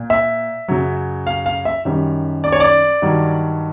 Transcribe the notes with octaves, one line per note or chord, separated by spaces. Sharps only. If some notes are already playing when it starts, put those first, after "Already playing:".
Already playing: A#2
E5
F#2 C#3 F#3
F5
F5
E5
F#2 D#3 G3
D5
C#5
D5
G2 D#3 F#3